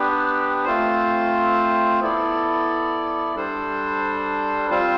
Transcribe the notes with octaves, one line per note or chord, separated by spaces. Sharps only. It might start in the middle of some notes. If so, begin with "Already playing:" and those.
Already playing: B3 D4 G4 B4
A3 C4 F4 C5
B3 E4 A4 D5
G3 D4 A4 C5
G3 C4 F4 C5